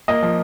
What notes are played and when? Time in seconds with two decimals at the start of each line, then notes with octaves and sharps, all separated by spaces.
0.08 A#3 D#5
0.23 F3